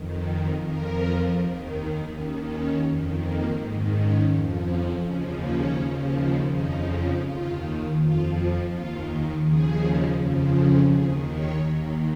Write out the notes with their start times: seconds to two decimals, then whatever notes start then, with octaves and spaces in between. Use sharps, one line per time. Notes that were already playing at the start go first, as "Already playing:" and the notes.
Already playing: F2 D#3
0.63 F2 F3 A#4
1.36 D#2 D#3
2.09 D#2 D#3 C#4
2.47 C#4
2.83 F2 D#3
3.21 A#3
3.56 G#2 D#3
3.94 C#4
4.30 F2 F3
4.67 C#4
5.03 D#2 C#3 F3 C#4
5.40 C#4
5.77 D#2 C#3 F3
6.50 F2 C#3 F3 D#4
7.23 D#2 D#3 F4
7.98 F2 F3 F4
8.71 D#2 D#3 F4
9.44 D#2 C#3 F3 G#4
10.18 F2 C#3 F3
10.55 G#4
10.91 D#2 D#3 G#4
11.29 C#5
11.65 D#2 D#3